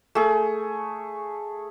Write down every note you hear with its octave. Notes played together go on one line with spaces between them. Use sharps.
A3 G#4